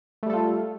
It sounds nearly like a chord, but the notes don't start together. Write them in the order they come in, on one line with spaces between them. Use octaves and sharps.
A3 G3 A4 F4